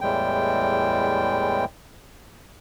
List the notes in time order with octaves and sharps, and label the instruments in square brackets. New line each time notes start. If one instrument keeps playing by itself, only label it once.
[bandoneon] E2 A2 E3 G3 G#3 G5